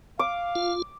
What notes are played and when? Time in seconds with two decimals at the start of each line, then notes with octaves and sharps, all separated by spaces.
0.19 F5 D6
0.56 F4